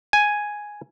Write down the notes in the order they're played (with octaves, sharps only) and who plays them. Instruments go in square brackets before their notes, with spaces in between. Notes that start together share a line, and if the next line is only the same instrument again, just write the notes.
[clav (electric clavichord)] G#5